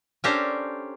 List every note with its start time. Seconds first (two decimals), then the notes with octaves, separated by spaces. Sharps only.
0.24 C#4 D4 G4 A4 A#4 C5